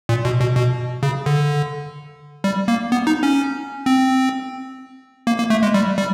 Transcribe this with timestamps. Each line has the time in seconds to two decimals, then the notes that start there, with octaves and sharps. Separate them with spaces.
0.09 A#2
0.25 B2
0.40 B2
0.56 B2
1.03 C#3
1.26 D3
2.44 G3
2.68 A#3
2.92 B3
3.07 D#4
3.23 C#4
3.86 C4
5.27 A#3
5.38 A#3
5.50 A3
5.63 G#3
5.74 G3
5.98 G3